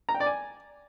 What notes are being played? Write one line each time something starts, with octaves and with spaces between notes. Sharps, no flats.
A#5
G5
D5
G#5